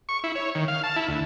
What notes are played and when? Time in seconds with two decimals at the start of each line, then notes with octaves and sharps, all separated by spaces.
0.09 C#6
0.24 E4
0.35 C#5
0.55 D#3
0.68 F5
0.84 A5
0.96 E4
1.08 D2